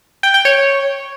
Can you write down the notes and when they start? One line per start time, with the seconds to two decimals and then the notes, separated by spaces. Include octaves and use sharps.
0.23 G5
0.34 G5
0.45 C#5